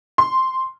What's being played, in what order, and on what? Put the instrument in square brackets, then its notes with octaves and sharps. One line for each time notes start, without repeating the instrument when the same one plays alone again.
[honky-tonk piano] C6